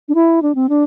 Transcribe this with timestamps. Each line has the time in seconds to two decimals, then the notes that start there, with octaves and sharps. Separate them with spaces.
0.08 D4
0.15 E4
0.42 D4
0.55 C4
0.69 D4